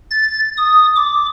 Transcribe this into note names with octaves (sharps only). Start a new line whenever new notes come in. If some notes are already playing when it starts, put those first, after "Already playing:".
A6
D#6
D6